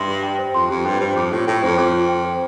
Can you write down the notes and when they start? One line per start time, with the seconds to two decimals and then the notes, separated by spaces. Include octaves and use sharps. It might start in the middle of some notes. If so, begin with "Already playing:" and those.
Already playing: G2 E5 C6
0.08 G4
0.23 G5
0.39 C5
0.54 F2 C6
0.70 F2 G4
0.85 G2 G5
1.00 G2 C5
1.16 F2 D6
1.31 A2 F4
1.47 A2 G5
1.62 F2 C5
1.78 F2 D6
1.93 F4
2.09 G5
2.25 C5